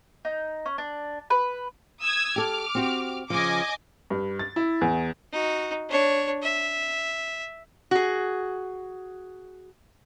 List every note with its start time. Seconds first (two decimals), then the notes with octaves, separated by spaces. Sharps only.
0.25 D#4
0.66 C#4
0.78 D4
1.30 B4
2.02 D#6 E6 G#6
2.36 G4 A4 D6 F6
2.75 C4 F#4 G4
3.30 C#3 F3 D#5 G#5 D6
4.10 G2
4.39 A6
4.56 E4
4.81 E2
5.32 D#4 F#4
5.89 D4 C#5
6.42 E5
7.91 F#4 G#4